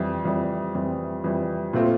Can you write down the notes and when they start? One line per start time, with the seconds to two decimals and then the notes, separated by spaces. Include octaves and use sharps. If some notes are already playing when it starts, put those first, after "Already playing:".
Already playing: F2 E3 G3
0.25 F2 E3 G3
0.75 F2 E3 G3
1.24 F2 E3 G3
1.73 A#2 A3 C4 F4